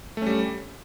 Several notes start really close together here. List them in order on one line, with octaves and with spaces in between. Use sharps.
A3 C#4 G3